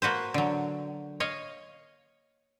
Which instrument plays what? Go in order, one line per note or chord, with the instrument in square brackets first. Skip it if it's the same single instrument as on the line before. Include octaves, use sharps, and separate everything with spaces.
[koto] A#3 F#4 B4 C5
D3 F#3
C#5 D#5 F5